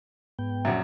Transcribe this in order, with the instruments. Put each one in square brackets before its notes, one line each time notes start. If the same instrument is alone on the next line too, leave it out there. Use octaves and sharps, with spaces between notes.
[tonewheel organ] G#2 B3 G5
[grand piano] A#1 F#2 [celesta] E5 F#5